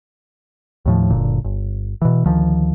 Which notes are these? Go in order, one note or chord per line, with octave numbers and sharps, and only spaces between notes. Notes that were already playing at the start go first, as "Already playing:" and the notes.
D#2 A2 F3
F#1 A#2 D3
G1
B2 E3
D2 D#3 F3